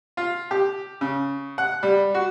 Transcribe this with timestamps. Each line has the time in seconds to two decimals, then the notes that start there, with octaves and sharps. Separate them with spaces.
0.17 F4
0.51 G4
1.01 C#3
1.58 F#5
1.83 G3
2.15 F#4